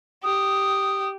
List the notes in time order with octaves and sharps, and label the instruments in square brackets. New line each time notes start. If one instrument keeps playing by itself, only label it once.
[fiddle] G4 [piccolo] D#6